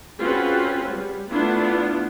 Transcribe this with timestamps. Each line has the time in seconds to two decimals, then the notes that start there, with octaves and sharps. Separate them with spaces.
0.20 C4 C#4 F4 F#4 G#4 B4
0.93 G3
1.30 A3 B3 D4 E4 F4